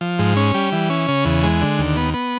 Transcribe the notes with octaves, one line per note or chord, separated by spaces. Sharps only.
F3
G#2
C#4
G3
E3
C#4
C#3
E2
G#3
D3
D#2
B3
B3